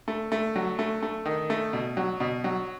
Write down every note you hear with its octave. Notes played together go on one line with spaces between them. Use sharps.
A3
A3
F#3
A3
A3
D#3
A3
B2
F#3
B2
F#3